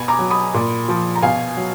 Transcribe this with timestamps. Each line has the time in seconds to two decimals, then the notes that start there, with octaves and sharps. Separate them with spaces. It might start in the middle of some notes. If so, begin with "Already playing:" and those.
Already playing: B2 G#5 B5
0.08 A#5 D6
0.19 F#3
0.30 B5 D#6
0.54 A#2
0.89 F3
1.16 A#5
1.22 B2 F5 G#5
1.57 F#3